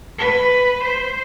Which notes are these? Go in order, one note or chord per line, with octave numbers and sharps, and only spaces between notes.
B4
C5